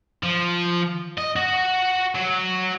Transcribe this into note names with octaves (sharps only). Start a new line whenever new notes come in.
F3
D#5
F#4
F#3